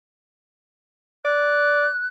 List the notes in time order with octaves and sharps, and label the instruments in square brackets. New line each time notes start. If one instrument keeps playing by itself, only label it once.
[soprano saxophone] D5 [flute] F#6